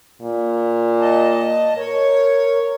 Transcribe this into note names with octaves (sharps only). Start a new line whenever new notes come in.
A#2
D#5 A5
A#4 C#5